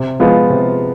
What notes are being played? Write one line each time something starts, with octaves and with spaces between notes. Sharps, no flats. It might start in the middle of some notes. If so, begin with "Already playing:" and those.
Already playing: C3
F3 G#3 B3 F4
C3